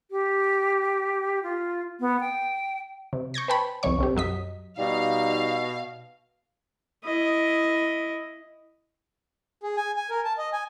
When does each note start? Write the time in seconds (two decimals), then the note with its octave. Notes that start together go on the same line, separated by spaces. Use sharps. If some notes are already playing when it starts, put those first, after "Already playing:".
0.11 G4
1.43 F4
2.00 B3
2.20 G5
3.13 C3
3.34 C#6 G6 G#6 A#6
3.48 B4 C5 G5 A5 B5
3.83 C2 F2 C3 C#5 C#6
3.98 B1 C4 G4
4.15 F#2 F#3 D#5 B6
4.79 B2 G3 D#4 F5
7.05 E4 D#5
9.63 G#4
9.76 G#5
9.96 G#5
10.10 A#4
10.25 A5
10.38 D#5
10.53 G#5